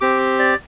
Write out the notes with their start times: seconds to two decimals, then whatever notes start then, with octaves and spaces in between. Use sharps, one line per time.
0.01 C4 G4 D6
0.39 D5